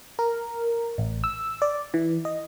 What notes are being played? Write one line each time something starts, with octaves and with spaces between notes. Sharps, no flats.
A#4
A1
E6
D5
E3
D#5